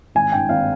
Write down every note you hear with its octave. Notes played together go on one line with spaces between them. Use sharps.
G#1 G#5
G2 G5
G#1 F5